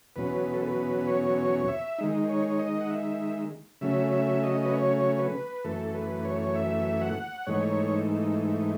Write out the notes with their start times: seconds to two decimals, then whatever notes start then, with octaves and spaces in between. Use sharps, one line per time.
0.16 E2 B2 F#3 C#4 B4
0.53 A4
0.62 B4
1.07 C#5
1.38 C#5
1.68 E5
1.98 D#3 G#3 D#4
2.29 C#5
2.59 D#5
2.81 F#5
2.90 E5
3.81 C#3 F#3 A3 C#4 E5
4.12 E5
4.43 D#5
4.65 B4
4.73 C#5
5.18 B4
5.64 F#2 E3 A3 A4
5.94 B4
6.25 C#5
6.55 E5
7.01 F#5
7.47 G#2 E3 A3 D#4 C#5